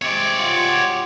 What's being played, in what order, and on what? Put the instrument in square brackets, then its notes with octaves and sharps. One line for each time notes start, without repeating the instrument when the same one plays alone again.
[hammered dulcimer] C3 G#3 [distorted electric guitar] C#5 D5
[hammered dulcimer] F4 F#4